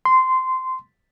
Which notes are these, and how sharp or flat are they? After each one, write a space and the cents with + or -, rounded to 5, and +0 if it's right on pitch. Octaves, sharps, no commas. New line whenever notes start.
C6 -15